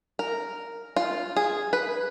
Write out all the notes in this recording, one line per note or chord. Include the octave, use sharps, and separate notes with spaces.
A#4
F4
G#4
B4